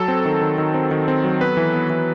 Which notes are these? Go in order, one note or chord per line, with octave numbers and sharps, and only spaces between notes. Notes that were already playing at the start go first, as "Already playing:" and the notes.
Already playing: F#3 A4
C4
D#3
D#3
D#3
C4
D#3
C4
F#3
B3 B4
E3
B3
E3